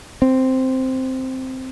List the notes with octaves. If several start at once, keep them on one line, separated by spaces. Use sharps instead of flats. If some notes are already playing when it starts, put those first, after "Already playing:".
C4